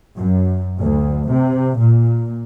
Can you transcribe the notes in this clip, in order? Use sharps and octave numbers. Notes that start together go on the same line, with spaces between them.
F#2
D2
C3
A#2